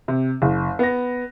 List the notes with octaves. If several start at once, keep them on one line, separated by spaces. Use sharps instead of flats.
C3
F#1
B3 A#6